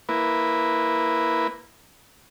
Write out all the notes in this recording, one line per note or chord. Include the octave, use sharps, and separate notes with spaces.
A#3 E4 B4